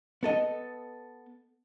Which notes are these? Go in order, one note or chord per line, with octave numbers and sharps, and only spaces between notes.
B3 A4 D#5